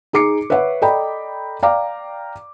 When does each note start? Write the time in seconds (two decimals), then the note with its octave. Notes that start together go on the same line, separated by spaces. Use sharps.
0.13 D#4 G#4 D6 C7 C#7
0.50 B4 C#5 E5 F#5
0.82 A4 D5 D#5 G5 A#5 B5
1.63 D5 F5 G5 A#5 D6